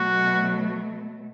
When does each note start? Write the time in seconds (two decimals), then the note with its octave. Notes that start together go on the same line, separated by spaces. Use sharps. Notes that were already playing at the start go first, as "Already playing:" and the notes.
Already playing: B2 F#3 A3 F#4